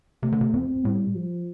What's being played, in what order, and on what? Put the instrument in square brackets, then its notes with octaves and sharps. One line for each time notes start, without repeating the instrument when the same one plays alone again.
[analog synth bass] C3 [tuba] A3
[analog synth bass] D3
C3
[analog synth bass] F2 [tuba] C4
[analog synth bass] A2 [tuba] G3
[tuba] F3